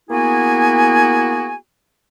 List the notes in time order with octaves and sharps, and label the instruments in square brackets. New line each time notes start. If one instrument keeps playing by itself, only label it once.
[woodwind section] A#3 B3 E4 F#4 G#4 G#5